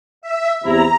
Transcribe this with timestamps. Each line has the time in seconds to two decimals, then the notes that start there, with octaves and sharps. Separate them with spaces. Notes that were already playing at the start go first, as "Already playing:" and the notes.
0.22 E5
0.65 E2 C3 E4 A#5